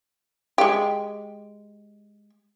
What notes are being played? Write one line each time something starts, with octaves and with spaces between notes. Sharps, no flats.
G#3 G4